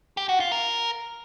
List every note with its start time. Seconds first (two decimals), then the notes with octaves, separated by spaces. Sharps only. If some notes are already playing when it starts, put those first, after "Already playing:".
0.17 G4
0.29 F#4
0.40 F4
0.52 A#4